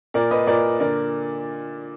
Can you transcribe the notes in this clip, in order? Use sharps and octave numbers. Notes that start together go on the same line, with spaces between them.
A#2 A#4 D5
B4 D#5
A#2 A#4 D5
D3 A#4 D5